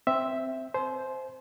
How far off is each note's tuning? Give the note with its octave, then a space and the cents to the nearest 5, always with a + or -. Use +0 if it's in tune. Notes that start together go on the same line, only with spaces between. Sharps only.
C4 +0 E5 +0
C5 -5 G#5 +45